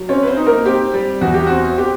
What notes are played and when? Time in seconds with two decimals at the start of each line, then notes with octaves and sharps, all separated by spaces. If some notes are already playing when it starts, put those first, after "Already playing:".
Already playing: F#3
0.09 C4 C#4 C#5
0.23 B4
0.27 C4 C5
0.37 D#4
0.46 A#3 A#4
0.65 C4 G4
0.94 G3
1.21 E2 F#4
1.34 G4
1.47 C4 F#4
1.78 C4 G4